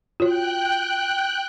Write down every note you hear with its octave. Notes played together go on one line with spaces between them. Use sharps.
F4 F#4 C#5 G5 F#6